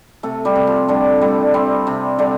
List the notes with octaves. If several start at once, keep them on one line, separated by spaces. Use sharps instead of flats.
C3 A3 A4
G3 G4
C3
F3 F4
D3 G3 D4
G3 A3
G3 C4
C3
D3 G3 D4